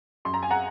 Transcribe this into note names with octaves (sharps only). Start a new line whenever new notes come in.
F#2 C6
A#5
G#5
F#5 A#5